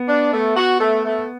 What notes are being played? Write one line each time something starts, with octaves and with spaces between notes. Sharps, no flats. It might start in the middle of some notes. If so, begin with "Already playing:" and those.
Already playing: B3
D4
A3
F#4
A3
A3